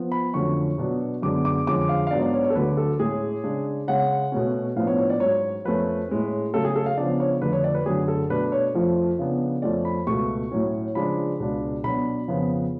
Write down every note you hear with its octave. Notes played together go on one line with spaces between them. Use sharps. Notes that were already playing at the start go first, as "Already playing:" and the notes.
Already playing: F3 B3
B5
F2 D3 F#3 A3 C#4 C#6
B2 F#3 B3 D4
F#2 D3 G#3 B3 D4 D6
D6
F2 D3 G#3 C#4 D6
F5
F5
G#2 F#3 B3 D4 D5
D5
C#5
C#5
A4
D2 D3 F#3 A3 B4
A4
A2 G#3 C#4 G#4
C#3 G#3 D4
C#3 G#3 C#4 F#5
B2 A3 C#4
A2 F3 B3 D4 F5
C#5
C#5
D5
G#2 F#3 C#4 C#5
F2 F3 A3 C#4 B4
A2 G#3 C#4
C#3 F#3 A3 C#4 A4
G#4
A4
F5
C#3 F3 B3 D4 D5
C#5
F2 D3 F3 A3 D4 B4
C#5
D5
B4
F#2 D3 F#3 A3 G#4
A4
B2 A3 D4 B4
C#5
F2 F3 A3
C#3 F3 B3 D4
F2 F3 A3 C#4 D5
B5
C#2 B2 A3 C#6
A2 F#3 C#4
C#3 F3 G#3 D4 B5
C#2 B2 G#3 D4
B2 F#3 B3 D4 B5
F2 C#3 F3 B3